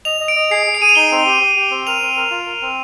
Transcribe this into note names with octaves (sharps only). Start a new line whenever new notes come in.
D#5 F7
D#5
D7
D#5
G#4 C7
G#4
D7
G#4 D#7
F7
D#4 G7
C4
G4
G4
G4
C4
A#4 F7
C4
A#4
F4
A#4
C4